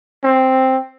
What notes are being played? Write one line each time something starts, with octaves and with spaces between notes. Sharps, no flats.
C4